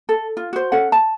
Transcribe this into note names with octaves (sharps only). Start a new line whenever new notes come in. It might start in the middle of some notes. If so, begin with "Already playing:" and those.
A4
F4
F#4 C5
C#4 A4 F#5
A5